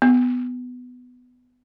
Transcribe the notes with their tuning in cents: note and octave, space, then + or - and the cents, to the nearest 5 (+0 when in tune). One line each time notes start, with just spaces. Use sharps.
B3 +10